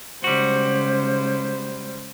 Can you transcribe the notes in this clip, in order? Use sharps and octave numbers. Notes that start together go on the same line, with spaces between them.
C#3 G3 G#3 F#4 C5